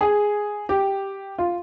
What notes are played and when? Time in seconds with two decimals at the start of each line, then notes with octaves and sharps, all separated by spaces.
0.01 G#4
0.69 G4
1.38 F4